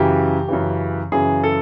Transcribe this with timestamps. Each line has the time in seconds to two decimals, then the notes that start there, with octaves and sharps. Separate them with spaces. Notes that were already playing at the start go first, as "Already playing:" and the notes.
Already playing: F#2 C#3 E3 G4
0.48 F#2 C#3 E3
1.12 F#2 C#3 E3 G#4
1.44 A4